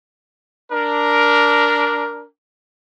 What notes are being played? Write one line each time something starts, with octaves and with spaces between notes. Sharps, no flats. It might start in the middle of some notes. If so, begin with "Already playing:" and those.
D4 A#4